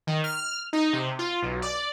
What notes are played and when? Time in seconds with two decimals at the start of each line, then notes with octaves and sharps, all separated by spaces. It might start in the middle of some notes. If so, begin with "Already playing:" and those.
0.07 D#3
0.24 F6
0.73 D#4
0.93 C3
1.19 F4
1.42 B1
1.62 D5